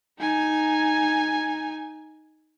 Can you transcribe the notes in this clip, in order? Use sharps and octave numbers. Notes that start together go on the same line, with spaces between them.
D#4 G#5